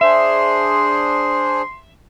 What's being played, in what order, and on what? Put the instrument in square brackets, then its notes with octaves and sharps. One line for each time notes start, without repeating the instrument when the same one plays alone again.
[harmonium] D4 G#4 C5 [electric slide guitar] E5 [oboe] C6